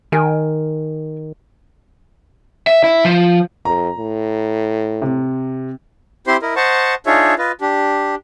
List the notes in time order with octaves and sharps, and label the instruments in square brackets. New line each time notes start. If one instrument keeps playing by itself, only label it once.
[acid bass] D#3 [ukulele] A#4 G5 G#5
[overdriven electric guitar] E5
E4
F3
[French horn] F2 [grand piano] A#5
[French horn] A2
[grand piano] C3
[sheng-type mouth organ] C4 E4 G4 C5 C6
E4 A#4 D#5
C5 D#5 F#5 A5 C#6
D4 D#4 F4 G#4 C#5 E5
F4 B4 D#5
D4 G4